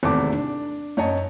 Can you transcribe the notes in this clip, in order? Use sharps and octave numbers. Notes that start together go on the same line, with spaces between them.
G#1 E2 C3 A3 A5 D6
D4
F#2 C#5 D#5 A5